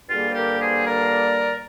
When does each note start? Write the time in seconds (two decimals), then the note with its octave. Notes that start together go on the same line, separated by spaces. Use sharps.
0.09 G2 D3 G3 A#3 F4 G#4
0.30 C5
0.34 G4 A#4
0.60 G#4 C5
0.85 A#4 D5